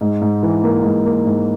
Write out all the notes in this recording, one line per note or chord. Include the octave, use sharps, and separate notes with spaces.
G#2
G#2
E3
A#3
G#2
A#3
G#2